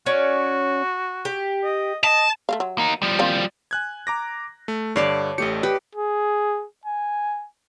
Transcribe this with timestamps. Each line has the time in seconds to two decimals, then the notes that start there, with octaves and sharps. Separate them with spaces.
0.06 C#4 F#4 D5
1.25 G4
1.64 D#5
2.04 D#5 A5
2.49 A3 A#3 F5
2.60 F#3
2.78 A#3 D#4
3.02 F3 G3
3.19 A#3 C4 F5
3.71 G#5 F#6 G#6
4.07 A#5 D6 A#6
4.68 A3
4.96 G2 D3 C#5 D5 A5 C7
5.38 A1 A3 G4 D#5 C#7
5.63 G4 B4
5.95 G#4
6.86 G#5